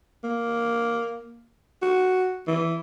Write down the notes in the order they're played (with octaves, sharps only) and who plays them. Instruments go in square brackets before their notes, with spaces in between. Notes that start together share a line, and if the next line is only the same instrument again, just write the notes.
[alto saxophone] A#3
F#4
E3